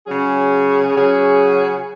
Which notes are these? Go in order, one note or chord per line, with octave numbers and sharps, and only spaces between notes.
C#3 F#3 C#4 G#4
C#3 F#3 C#4 G#4